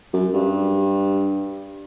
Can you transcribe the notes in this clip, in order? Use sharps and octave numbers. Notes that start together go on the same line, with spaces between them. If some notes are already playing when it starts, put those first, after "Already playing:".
F#2
G2